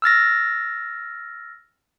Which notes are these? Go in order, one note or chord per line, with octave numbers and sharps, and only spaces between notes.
E6 F6 A6 A#6